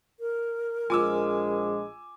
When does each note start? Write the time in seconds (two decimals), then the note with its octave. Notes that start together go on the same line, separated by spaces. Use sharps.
0.20 A#4
0.90 A#1 F3 G#3 F4 G#5 D6 E6